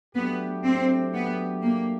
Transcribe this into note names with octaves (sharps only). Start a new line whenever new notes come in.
F#3 A3 B3 D4 G4
C4
B3
A#3